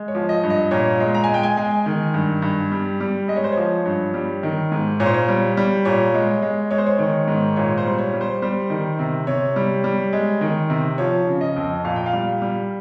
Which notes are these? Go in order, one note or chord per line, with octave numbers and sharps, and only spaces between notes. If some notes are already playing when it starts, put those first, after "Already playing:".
Already playing: G#3
C#5
F3
D#5
G2
D#5
A#2 C#5
G#3
A#5
G#5
G#3 G5
G#5
G#3 G#5
D#3
G2
G2
G3
G3
G#3 D#5
C#5
C5
F3 C#5
G2
G3
D#3
G#2
A#2 C#5
C5
C#5
G3
G3
A#2 C#5
G#3
G#3
G#3 C#5
C5
C#5
D#3
G#2
A#2 C#5
C5
G3
C#5
G3
C5
G3 C5
D#3
C3
C3 C#5
G3
G3
G#3
D#3
C3
F3 C#5
C#3
D#5
F2
A#2 F5
G5
F5
G3
G3